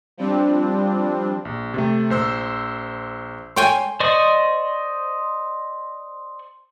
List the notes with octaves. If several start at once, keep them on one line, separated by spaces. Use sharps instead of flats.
F3 G3 C4 D4
A#1
C3 A3
A#1 C5 E6
C#5 G5 G#5 C6
C5 D5 D#5 C#6